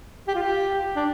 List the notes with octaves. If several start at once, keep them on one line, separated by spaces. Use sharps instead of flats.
G4
F4
G4
D4